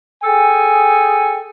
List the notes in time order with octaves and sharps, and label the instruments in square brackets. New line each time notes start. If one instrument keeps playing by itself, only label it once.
[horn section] G#4 A4 G5 G#5